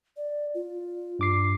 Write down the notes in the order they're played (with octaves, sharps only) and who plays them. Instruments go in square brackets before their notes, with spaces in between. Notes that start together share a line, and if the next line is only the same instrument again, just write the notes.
[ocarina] D5
F4
[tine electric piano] G2 D6 C7